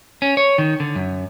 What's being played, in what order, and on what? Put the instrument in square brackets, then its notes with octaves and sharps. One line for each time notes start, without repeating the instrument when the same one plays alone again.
[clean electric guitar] C#4
C#5
D#3
D3
F#2